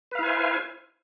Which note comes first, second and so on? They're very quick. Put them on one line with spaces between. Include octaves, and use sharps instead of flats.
B4 F5 E4 G#5 C5